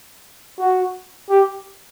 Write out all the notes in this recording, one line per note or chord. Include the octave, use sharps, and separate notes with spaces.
F#4
G4